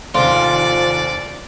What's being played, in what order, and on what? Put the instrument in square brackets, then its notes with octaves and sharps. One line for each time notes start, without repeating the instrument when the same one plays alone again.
[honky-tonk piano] F1 D#2 [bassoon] F3 [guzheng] F4 [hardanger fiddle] D5